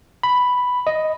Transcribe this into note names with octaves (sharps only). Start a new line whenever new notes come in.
B5
D#5